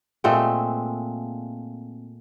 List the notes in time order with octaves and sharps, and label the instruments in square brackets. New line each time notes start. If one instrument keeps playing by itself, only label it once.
[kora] A#2 G#3 A3 C4